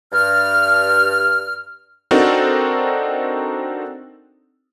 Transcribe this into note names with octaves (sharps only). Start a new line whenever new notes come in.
G2 F6
C4 D4 D#4 F#4 A4 A#4